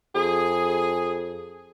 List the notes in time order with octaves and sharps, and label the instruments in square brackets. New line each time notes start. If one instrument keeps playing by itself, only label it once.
[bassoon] F2 [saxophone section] G#4